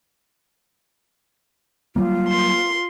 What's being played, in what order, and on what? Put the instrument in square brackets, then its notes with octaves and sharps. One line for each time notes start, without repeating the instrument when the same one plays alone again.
[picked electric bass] F#3 G3 A#3 [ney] F4
[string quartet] C6